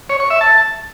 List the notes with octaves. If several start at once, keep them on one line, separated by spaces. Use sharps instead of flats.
C#5
C#6
E5
A5